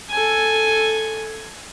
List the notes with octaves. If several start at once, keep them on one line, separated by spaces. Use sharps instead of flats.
A4 G#5